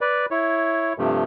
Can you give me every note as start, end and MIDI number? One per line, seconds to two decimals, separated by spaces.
0.01 0.26 71
0.01 0.26 74
0.31 0.93 64
0.31 0.93 73
0.98 1.24 43
0.98 1.24 48
0.98 1.24 53
0.98 1.24 57